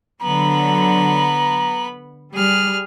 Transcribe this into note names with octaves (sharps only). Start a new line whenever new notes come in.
D3 F#3 B3 A#5 B5
G3 G#4 F6